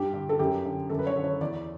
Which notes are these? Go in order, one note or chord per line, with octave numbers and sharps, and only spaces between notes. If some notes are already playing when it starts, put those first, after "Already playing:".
Already playing: G2 G4
D3
A4
F#2 G4
D3
F#2 A4
B4
C#5
D3
C#5
E2 D5